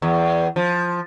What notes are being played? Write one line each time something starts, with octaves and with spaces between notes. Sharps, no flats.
E2
F3